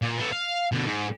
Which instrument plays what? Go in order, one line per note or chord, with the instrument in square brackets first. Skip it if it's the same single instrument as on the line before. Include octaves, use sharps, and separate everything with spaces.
[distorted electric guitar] A#2
B3 A4
F5
B2 D3
G#2